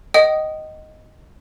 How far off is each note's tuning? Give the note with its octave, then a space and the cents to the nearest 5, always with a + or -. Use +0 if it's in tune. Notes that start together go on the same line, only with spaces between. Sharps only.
D#5 +0 G5 -45 D#6 -10